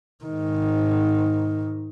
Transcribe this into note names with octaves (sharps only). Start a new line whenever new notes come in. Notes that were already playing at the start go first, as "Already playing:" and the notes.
G#2 D#3